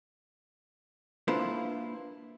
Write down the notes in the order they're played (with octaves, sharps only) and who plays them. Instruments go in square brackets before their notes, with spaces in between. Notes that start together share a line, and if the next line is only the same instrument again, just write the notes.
[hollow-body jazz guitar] A#3 D4 E4 F4 B4 C5